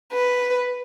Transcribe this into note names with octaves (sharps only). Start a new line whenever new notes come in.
B4